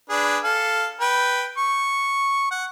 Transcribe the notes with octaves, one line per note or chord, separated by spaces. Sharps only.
D4 G#4 B4
A4 F5
B4 G5
C#6
F#5